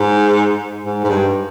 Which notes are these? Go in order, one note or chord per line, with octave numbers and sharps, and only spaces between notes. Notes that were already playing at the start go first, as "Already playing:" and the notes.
Already playing: G#2
G#2
G#2
G2